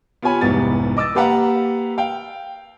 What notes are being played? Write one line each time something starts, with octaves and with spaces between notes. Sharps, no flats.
B3 F4 G4 C#5 G#5 B5
F1 C2 G#2 B3 A6
D#5 D6 E6 A6
A#3 G4 B4 F5 F#5 A#5
F5 G5